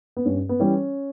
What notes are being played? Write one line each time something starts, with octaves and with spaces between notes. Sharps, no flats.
B3
G2 C#4
B3
E3 G3 C#4